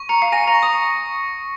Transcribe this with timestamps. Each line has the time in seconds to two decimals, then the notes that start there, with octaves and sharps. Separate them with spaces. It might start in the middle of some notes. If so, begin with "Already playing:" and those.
Already playing: C#6
0.09 A#5 C#7
0.22 F5
0.32 G#5 A#6
0.47 A#5
0.54 C#6
0.63 D#6